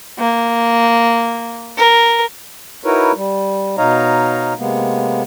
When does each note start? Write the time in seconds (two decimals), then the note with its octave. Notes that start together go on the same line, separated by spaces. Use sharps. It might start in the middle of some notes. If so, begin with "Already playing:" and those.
0.18 A#3
1.77 A#4
2.84 D#4 E4 F#4 A#4 B4 C#5
3.15 G3
3.78 B2 D#4 C#5 D#5 F5 A#5
4.58 C3 G#3 A#3 B3